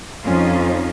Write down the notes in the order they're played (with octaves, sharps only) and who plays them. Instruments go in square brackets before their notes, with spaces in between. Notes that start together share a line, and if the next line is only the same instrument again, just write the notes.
[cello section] F2 C#4 D#4 F4